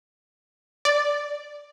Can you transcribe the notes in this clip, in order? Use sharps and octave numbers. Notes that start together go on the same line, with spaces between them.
D5